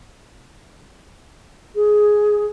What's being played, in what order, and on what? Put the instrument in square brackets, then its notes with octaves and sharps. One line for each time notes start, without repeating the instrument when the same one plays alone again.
[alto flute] G#4